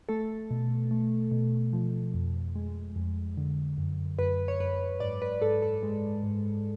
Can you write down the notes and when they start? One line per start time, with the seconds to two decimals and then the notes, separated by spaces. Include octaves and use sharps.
0.09 A3 A4
0.51 B2
0.91 A3
1.31 B2
1.73 F3
2.14 F2
2.55 G#3
2.96 F2
3.37 D3
3.78 F#2
4.19 F#2 B4
4.48 C#5
4.60 F#2 B4
5.00 G#2 D5
5.22 B4
5.42 G#2 A4
5.62 A4
5.83 G#3
6.23 G#2